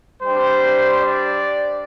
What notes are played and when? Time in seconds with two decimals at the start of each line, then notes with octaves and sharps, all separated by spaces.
0.22 G3 D4 G4 C5
1.00 D5